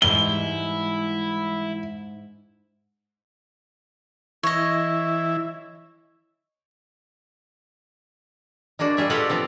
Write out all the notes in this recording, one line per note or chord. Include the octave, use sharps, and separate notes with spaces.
G#2 E3 G3 G#3 E4 G7
E3 E4 C#5 D#5
G#3 A#3 D4 F#4
G3 G#4 E5
F4 G4 A4 B4 D#5 F#5
F3 B3 C4